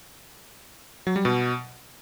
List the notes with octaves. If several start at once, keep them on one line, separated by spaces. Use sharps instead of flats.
F#3
G3
B2